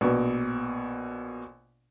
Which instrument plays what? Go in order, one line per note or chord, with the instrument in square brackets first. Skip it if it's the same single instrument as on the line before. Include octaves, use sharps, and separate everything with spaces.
[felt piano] A#1 B2